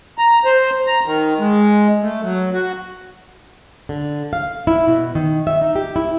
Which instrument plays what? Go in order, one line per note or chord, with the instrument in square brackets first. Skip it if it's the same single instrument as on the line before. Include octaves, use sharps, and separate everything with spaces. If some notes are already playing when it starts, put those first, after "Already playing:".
[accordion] A#5
C5
A#5
D#3
G#3
A3
F#3
F#4
[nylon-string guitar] D3
F5
E4
B2
D#3
E5
D#4
G4
E4